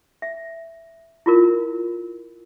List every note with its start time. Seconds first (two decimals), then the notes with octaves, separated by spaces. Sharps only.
0.22 E5
1.26 E4 F4 A#4